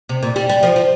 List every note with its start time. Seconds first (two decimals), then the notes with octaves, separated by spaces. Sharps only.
0.09 C3
0.23 A#2
0.36 G3
0.49 G3
0.63 F3
0.76 F3